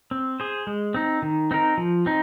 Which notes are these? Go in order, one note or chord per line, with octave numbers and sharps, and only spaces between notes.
C4
G#4 C5
G#3
C4 D#4
D#3
C4 D#4 A#4
F3
C4 D#4